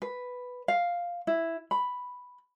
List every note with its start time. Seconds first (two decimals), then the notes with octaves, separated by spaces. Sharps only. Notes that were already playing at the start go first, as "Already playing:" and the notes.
0.02 B4
0.68 F5
1.27 E4
1.71 B5